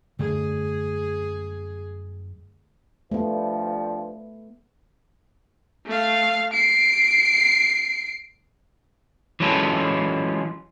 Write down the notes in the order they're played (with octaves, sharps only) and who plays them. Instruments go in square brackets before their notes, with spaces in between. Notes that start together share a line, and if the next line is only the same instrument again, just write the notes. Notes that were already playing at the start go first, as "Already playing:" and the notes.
[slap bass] F#2 G3 [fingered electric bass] D3 A3 [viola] G#4
[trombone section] G2 F3 [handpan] A3 B3
[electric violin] A3 F5
C7 D7
[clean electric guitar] E3 F#3 G#3 C#4 F4 A4